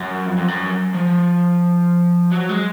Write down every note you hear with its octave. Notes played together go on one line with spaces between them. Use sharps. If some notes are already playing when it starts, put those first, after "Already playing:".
Already playing: F#2
F2
F2
F#2
F3
F#3
G#3